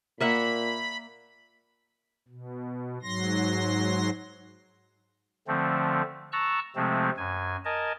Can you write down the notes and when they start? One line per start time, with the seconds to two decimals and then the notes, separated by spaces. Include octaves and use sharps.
0.20 A#2 A#3 E5 F#5 B5
2.28 B2
3.02 G#2 F#3 C6 A#6
5.48 D3 F3 A3 C4
6.32 A5 A#5 C#6 E6 F#6
6.76 C3 F3 G#3 A3 C4
7.17 F#2 G#5
7.65 A#4 D#5 G#5 A5